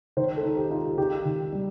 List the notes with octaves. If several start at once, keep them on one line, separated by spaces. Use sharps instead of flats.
D#3 C5
A4
D#4
G4
D#4 F4
G4
D#3 G4
D#3
G3